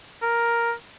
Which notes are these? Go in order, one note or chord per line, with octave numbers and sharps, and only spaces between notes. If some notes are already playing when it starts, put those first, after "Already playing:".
A#4